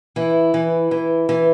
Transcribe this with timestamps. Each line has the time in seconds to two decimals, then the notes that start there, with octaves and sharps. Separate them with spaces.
0.16 E3 E4
0.54 E3
0.91 E3
1.29 E3